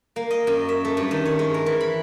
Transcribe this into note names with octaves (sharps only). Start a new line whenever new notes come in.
A#3
D#5
F#2
E5
A3
G2
D#3
C#5
G#3
A#4
E3
B5